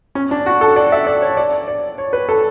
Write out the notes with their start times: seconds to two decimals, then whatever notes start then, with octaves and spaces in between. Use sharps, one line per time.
0.15 C#4
0.31 D4
0.46 F#4
0.61 A4
0.76 D5
0.92 E5
1.07 D5
1.22 C#5
1.37 D5
1.68 D5
1.98 C#5
2.13 B4
2.29 A4